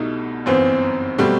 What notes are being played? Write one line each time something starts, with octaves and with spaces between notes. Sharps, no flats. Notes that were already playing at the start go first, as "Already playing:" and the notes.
Already playing: C2 B2 A3 D#4 E4
G1 F#2 E3 B3 C4
B2 F#3 G3 A3 C4